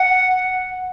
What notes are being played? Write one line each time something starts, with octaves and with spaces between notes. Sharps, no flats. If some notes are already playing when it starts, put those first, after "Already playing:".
Already playing: F#5